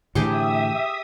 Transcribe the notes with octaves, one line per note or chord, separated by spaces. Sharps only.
A2 D3 E3 G4 G#4 E5 G5 D#6